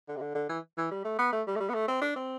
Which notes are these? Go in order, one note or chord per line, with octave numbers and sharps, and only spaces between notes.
D3
C3
D3
D3
E3
E3
G3
A3
B3
A3
G3
A3
G3
B3
A3
C4
D4
C4